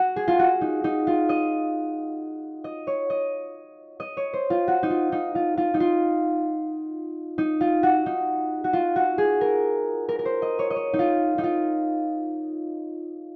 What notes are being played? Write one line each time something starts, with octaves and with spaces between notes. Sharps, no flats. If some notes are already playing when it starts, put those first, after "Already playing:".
Already playing: F#4
G#4
F4
F#4
D#4
D#4
F4
D#5
D#5
C#5
D#5
D#5
C#5
C5
F4
F#4
D#4
F4
D#4
F4
F4
D#4
F4
D#4
F4
F#4
D#4
F#4
F4
F#4
G#4
A#4
A#4
A#4
C5
D#5
C#5
D#5
C#5
D#4
F4
D#4
F4